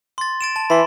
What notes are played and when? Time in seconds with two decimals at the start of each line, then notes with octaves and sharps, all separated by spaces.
0.18 C6 A6
0.41 A6 D7 E7
0.56 A5
0.70 E3 B5 C6